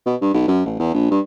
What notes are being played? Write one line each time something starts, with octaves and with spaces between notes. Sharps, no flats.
B2
G2
B1
F#2
A1
E2
A#1
G2